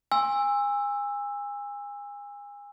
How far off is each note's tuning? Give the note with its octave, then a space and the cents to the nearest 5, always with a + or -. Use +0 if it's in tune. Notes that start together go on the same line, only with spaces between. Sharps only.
G#5 -30 C6 +25 E6 +5